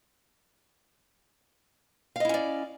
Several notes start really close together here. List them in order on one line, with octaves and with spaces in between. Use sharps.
F5 D#5 E4 C#4 D5